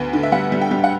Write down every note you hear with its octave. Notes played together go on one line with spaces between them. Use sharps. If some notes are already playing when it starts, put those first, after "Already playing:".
Already playing: D2 B3 B4
D3
E5
G3 F#5
G3
G5
G3
F#5